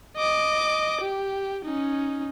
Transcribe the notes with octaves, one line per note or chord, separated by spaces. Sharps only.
D#5 D6
G4
C#4 D#4